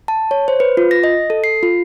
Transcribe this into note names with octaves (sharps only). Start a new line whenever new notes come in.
A5
C#5
C5
B4
F4
A#6
D#5
A4
C7
F4